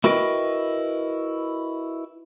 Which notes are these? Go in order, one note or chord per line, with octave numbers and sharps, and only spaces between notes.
E4 F#4 A#4 B4 D#5 G5